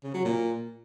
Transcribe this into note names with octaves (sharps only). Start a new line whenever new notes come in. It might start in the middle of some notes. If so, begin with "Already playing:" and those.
C#3
F#3
A#2